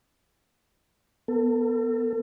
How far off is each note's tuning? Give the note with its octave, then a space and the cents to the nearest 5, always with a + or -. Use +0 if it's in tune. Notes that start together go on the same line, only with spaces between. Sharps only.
B3 -5 A4 +40